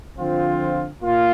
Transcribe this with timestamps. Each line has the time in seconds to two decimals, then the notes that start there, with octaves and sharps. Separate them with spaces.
0.18 D3 F3 C4 F4
1.02 A#2 A#3 F4